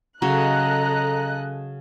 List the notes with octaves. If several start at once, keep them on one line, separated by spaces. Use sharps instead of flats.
C#3 F#3 A4 D#5 A#5 F#6